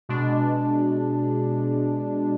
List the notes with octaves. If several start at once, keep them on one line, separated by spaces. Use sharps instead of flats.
B2 G#3 D4